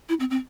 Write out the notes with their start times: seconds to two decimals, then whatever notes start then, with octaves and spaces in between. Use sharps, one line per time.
0.09 E4
0.20 C4
0.30 C4